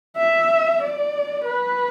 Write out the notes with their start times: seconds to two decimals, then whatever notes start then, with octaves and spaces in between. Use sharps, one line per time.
0.17 E5
0.82 D5
1.45 B4